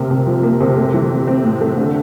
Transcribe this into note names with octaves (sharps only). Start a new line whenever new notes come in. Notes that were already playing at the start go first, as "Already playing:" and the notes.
Already playing: C3 A#3
C3
F3
A#3
C3
A3
E3
C4
C4
A2
A3
D3